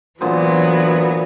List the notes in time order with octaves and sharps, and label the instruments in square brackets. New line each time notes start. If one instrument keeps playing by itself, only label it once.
[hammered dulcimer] A#2 D3 C5 [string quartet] E3 F#3 B3